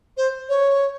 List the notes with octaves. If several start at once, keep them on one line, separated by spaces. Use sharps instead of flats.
C5
C#5